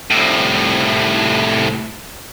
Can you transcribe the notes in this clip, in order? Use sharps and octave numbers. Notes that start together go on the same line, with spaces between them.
C2 A2